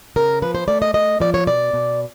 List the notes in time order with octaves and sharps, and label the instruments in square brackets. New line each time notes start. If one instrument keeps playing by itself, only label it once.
[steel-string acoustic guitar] C#3 A#4
F3 B4
C5
A3 D5
D#5
A3 D#5
F3 D5
C#5
B2 D5
B2